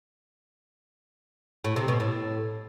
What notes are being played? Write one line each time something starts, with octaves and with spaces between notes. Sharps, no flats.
A2
C3
B2
A2